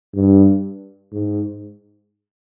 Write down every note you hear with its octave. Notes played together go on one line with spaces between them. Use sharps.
G2
G#2